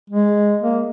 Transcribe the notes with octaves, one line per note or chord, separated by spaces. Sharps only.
G#3
A#3